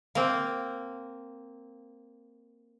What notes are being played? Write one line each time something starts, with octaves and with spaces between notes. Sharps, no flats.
A#3 C4